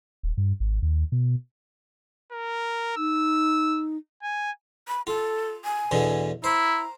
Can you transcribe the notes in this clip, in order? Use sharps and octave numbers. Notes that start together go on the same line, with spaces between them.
D#1
G2
G#1
D#2
B2
A#4
D#4 E6
G#5
B5
F4 A4
G#5
E2 B2 D3
E4 C5 A#5